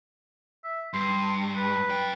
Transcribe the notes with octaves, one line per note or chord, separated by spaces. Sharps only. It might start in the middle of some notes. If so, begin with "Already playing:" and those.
E5
G2 C6
B4
F#2 G5